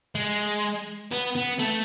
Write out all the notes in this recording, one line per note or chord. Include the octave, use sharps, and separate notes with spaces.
G#3
B3
B3
A3